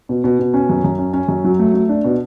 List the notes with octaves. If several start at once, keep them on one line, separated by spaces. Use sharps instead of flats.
B2
B2
B2
C#4
F#2
F#2
C#4
C#4
F#2
F#3
A3
A3
D4
B2